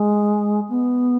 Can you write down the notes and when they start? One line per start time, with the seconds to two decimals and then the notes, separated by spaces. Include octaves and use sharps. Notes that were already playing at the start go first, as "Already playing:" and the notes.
Already playing: G#3
0.69 B3